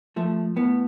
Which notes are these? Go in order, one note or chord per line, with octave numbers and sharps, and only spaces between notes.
F3 A3
A2 B3